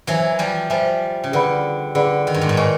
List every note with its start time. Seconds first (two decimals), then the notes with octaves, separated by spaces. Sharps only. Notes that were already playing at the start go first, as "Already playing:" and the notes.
0.07 E3 F#3 C5 E5 G#5
0.39 F3 G3
0.70 F3 G3 C5 E5 G#5
1.24 C#3
1.32 D3 G#4 B4 D5 F#5 B5
1.95 D3 G#4 B4 D5 F#5 B5
2.27 D#3
2.34 G2
2.41 G#2
2.49 A2
2.57 A#2 B4 D#5 G#5 C#6